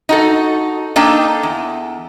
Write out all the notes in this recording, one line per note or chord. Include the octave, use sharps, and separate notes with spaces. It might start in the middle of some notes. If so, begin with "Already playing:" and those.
D#4 F#4 A4
A#3 D4 D#4 A4 G5
E2